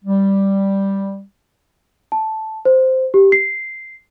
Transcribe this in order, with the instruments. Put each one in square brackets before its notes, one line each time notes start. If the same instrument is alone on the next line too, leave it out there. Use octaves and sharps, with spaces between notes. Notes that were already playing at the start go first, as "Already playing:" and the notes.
[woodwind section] G3
[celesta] A5
C5
G4
C7